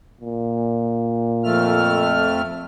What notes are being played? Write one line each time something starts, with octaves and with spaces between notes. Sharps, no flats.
A#2
F2 A3 F6